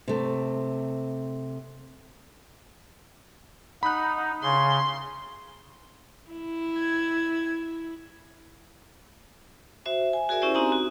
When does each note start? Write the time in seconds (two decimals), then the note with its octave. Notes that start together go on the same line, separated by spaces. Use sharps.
0.08 C3 A3
3.83 D#4 F#5 B5 F#6
4.43 C#3 C6
6.30 E4
6.79 G#6
9.86 F#4 C5 E5
10.13 G#5
10.29 F#4 G#4 A#4 D5 E5 G#5
10.42 C#4 E4 G4 C5 D5
10.54 C4 D#4 F#4 G4 G#5 A#5
10.72 F#4